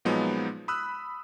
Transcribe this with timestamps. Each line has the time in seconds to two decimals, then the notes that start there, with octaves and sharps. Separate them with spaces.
0.05 A#2 F3 F#3 G#3 B3 D#4
0.68 B5 D#6 E6 F#6